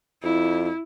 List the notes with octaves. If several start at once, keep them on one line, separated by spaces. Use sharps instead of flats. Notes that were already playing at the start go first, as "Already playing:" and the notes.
F2 E4